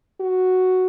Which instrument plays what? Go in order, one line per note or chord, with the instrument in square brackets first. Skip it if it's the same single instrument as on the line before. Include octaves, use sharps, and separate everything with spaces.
[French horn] F#4